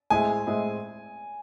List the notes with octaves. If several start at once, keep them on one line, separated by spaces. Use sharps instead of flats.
A2 G#3 C4 E4 G#4 G#5
A2 G#3 C4 E4 G#4